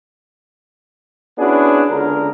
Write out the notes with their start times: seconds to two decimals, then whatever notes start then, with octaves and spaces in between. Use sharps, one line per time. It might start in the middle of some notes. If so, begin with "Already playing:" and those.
1.38 B3 C#4 D4 E4 F#4 G#4
1.90 C#2 D3 A#4